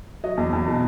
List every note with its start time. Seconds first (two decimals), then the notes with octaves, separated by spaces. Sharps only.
0.24 F#3 D#5
0.37 E2
0.53 E2
0.68 B2